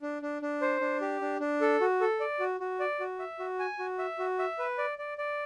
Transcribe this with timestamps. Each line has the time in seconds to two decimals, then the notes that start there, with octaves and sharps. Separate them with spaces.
0.02 D4
0.22 D4
0.42 D4
0.61 C5
0.81 D4
1.01 G4
1.21 D4
1.40 D4
1.61 A4
1.81 F#4
2.01 A4
2.20 D5
2.40 F#4
2.60 F#4
2.80 D5
3.00 F#4
3.19 E5
3.39 F#4
3.59 G#5
3.79 F#4
3.99 E5
4.19 F#4
4.39 E5
4.59 B4
4.78 D5
4.98 D5
5.18 D5